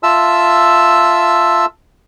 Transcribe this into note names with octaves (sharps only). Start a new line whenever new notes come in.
F4 E5 A5 E6